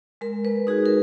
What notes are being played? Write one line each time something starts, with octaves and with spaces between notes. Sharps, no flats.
G#3 A#4
B4
D#4 F#4 G#4
A#4